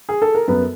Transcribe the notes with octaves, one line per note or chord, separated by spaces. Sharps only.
G#4
A4
A#4
F#2 B3 B4